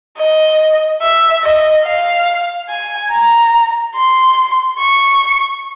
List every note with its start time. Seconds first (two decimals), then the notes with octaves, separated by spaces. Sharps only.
0.17 D#5
1.01 E5
1.43 D#5
1.85 F5
2.69 G#5
3.11 A#5
3.95 C6
4.79 C#6